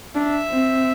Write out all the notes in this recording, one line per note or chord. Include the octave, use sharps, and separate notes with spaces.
D4 E5
C4